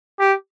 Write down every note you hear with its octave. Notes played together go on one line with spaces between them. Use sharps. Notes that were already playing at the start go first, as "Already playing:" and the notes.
G4